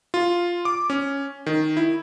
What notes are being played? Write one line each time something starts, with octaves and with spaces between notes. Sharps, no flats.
F4
D6
C#4
D#3
E4